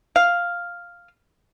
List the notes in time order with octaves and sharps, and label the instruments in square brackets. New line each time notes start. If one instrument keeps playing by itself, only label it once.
[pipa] F5